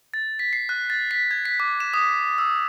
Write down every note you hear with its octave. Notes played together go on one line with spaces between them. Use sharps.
A6
B6
C7
F#6
A6
B6
G#6
B6
D6
E7
D#6
E6